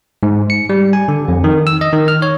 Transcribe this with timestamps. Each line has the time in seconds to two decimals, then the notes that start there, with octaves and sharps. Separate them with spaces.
0.23 G#2
0.50 C#7
0.69 G3
0.93 G#5
1.08 D3
1.28 F2
1.44 D#3
1.67 E6
1.81 D#5
1.93 D#3
2.08 F6
2.22 C#5